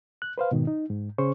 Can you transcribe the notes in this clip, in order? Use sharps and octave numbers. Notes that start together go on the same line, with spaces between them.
F#6
B4 C5 F5
G#2 B2 D#3
D#4
G#2
C#3 C#4 G#4 C5 C#6